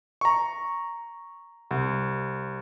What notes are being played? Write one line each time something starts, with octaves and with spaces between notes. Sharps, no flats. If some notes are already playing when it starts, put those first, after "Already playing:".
A#5 C#6
C2